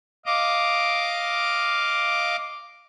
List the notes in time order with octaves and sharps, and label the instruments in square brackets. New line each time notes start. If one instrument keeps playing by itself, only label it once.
[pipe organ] D#5 F5 D6